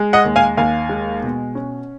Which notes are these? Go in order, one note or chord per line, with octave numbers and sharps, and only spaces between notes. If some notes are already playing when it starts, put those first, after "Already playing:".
Already playing: G#3
D#5 F#5
D#2
F5 G#5
D#2 F5 G#5
G#3
B2
C#4